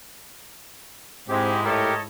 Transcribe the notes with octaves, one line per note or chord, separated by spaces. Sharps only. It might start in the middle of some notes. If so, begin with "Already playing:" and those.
G#2 G#3 C4 E4 G4
A2 G4 A4 A#4 C#5 D#5